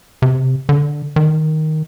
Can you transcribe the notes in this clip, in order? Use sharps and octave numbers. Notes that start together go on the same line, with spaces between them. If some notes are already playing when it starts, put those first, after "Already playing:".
C3
D3
D#3